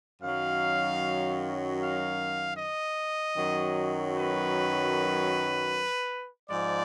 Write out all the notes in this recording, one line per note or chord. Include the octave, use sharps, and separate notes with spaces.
F#2 D#3 F#3 F5
F5
D#5
F#2 D#3 F#3
B4
G#2 F3 G#3 D5